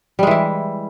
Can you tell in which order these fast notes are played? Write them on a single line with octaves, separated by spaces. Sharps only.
G3 G#3 E3 E4